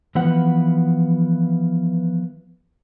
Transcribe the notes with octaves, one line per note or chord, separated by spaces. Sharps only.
E3 F3 B3 B4 F#5